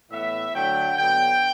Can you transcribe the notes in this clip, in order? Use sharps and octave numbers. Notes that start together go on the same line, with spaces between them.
A2 E3 B3 E5
D3 F#3 A3 G5
D3 F#3 B3 G5